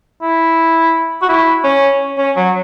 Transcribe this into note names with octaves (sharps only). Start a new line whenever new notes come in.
E4
F#4
E4
C#4
C#4
F#3